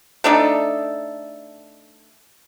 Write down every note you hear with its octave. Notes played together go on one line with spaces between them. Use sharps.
A3 D4 D#4 A4